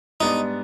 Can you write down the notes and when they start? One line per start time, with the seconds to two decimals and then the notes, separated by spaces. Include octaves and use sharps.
0.20 G#2 G3 B3 D4 D#4